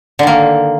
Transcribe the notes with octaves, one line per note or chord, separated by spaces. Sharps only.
D3 D#3 A#3